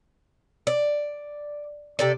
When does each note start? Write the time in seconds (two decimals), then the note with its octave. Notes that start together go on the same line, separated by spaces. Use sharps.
0.67 D5
1.99 C3 A4 D5